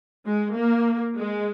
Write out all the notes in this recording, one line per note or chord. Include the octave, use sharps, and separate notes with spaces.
G#3
A#3
G#3